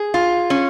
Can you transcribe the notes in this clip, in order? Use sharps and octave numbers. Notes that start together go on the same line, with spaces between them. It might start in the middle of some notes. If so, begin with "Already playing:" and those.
Already playing: G#4
F4
C#4